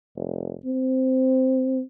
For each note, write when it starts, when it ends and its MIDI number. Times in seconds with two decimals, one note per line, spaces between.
0.16 0.55 29
0.65 1.81 60